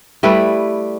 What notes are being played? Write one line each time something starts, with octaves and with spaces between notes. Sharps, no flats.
G3 A3 E4 B4